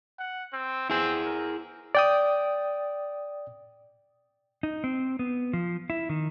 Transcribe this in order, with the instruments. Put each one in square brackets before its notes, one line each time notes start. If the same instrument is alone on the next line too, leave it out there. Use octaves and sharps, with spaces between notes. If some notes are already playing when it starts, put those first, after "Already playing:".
[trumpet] F#5
C4
[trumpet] C4 [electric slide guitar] E4 G#4
[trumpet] A#4
[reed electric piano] D5 G5 D#6
[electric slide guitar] D#4
C4
B3
F3
E4
D#3